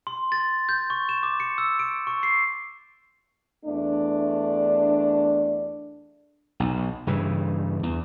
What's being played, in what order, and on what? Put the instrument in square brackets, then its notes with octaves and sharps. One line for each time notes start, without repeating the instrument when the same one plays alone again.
[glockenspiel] C6
A6
G6
C#6
E7
D6
C#7
E6
D7
C#6
C7
[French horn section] E2 A3 D4
[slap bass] B1
G2 C#3 E3
E2